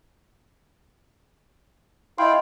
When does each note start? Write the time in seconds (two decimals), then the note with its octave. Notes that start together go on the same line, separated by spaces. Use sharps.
2.18 E4 D#5 F5 G5 C6